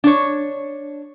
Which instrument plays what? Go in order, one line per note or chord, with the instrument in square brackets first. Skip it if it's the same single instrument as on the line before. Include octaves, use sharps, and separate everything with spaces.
[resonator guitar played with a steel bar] D4 C#5